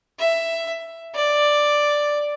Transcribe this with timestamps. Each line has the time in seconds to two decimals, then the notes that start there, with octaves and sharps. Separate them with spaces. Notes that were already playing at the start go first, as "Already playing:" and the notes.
0.19 E5
1.15 D5